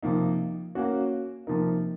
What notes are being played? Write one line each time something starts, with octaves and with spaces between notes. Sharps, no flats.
C3 F3 A#3 D#4
A#3 C#4 F#4
C3 F3 A#3 D#4 A#4